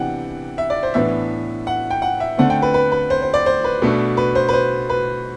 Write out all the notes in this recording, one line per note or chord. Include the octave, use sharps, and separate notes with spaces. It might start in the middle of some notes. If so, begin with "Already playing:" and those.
Already playing: C3 E3 B3 D4 F#5 G5
E5
D5
C5
A2 E3 B3 D4 E5
F#5
G5
F#5
E5
D3 A3 C4 F#5
G5
B4
B4
B4
C5
C5
D5
C5
B4
B2 A3 D4
B4
C5
B4
C5
B4